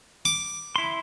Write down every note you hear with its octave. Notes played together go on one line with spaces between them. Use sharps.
D6
E4 C6